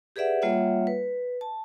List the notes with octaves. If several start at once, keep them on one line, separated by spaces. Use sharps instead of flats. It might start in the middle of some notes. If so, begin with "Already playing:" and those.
G4 G#4 B4 D5 E5 F#5
G3 A#3 F4 C#5 E5 F#5
B4
A5